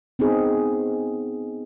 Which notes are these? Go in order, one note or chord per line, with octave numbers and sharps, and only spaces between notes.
B3 C4 D#4 G#4